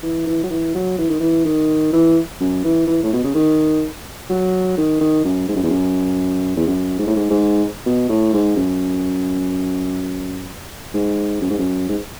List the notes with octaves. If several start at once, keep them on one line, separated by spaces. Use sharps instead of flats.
E3
E3
F#3
E3
F#3
E3
D#3
E3
D#3
E3
F#2
E3
E3
A2
B2
C#3
D#3
F#3
D#3
D#3
F#2
G#2
F#2
E2
F#2
E2
F#2
G#2
A2
G#2
G#2
B2
A2
G#2
F#2
G#2
F#2
G#2
F#2
G#2